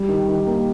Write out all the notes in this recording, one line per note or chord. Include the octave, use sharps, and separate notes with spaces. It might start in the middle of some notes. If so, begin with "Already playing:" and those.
Already playing: G3
D#3
D#3
A#3